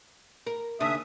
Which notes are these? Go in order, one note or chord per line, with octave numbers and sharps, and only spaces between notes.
A#4
D#2 C#3 D4 E5 D#6